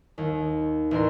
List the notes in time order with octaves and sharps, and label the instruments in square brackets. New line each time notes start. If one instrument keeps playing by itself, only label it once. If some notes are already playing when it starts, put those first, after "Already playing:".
[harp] D#2
A1 A#4 C6